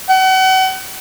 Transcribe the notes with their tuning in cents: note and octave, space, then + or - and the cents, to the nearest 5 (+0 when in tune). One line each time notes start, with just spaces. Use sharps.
F#5 +35